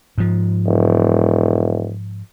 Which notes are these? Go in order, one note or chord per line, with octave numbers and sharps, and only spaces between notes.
G#2 F3
E1